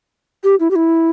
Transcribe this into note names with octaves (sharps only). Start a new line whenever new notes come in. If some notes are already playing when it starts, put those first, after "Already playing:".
G4
E4
G4
E4